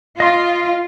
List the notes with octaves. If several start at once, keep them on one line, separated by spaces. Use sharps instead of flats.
F4 D#5 C6